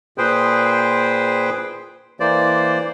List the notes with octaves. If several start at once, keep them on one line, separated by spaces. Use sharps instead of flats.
A#2 G#4 B4 C5 G5
E3 A#3 C5 D5